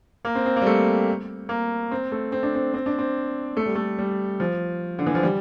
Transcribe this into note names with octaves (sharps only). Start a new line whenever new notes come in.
A#3
C4
C4
A#3
G3
A3
A#3
C4
A3
C4
D4
C4
C4
D4
C4
A3
G3
A3
G3
F3
D3
E3
F3
G3